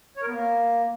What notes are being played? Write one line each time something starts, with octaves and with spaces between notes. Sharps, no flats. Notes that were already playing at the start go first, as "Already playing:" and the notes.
C#5
A#4
B3
A#3